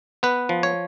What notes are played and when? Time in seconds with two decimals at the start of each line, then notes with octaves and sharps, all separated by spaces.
0.23 B3 B4
0.49 F3
0.63 C#5